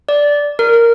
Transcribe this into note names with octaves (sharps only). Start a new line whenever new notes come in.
D5
A#4